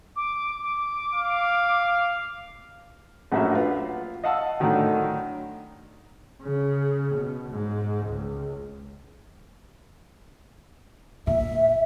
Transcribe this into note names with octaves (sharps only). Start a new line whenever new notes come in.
D6
D6
F5
A#1 F#2 A2 A#3 F#4 E5
F4 B4 F#5
D#5 F5 F#5 A5 E6
A2 D3 D#3 F#3
C#3
B2
G#2
C#2
A#2 E5